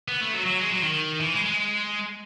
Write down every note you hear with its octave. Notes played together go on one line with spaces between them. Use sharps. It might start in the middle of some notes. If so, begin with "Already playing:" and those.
B3
A3
F#3
F#3
G#3
F#3
D#3
E3
G#3
G#3